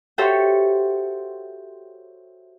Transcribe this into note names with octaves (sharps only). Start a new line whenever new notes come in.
F#4 G4 A4 C5 C#5 E5